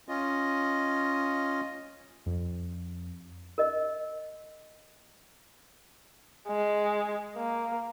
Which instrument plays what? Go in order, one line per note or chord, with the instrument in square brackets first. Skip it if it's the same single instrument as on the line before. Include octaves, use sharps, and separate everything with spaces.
[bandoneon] C#4 F4 D#5
[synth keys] F2
[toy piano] A#4 D#5
[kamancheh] G#3
A#3